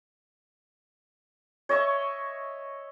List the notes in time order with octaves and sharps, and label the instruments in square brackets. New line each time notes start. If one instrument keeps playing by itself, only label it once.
[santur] C#5 D#5 E5 C#6